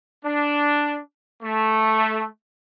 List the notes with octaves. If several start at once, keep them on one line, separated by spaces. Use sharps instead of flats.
D4
A3